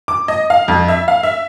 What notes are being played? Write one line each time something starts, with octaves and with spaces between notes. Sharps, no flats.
D6
D#5
F5
F2
E5
F5
E5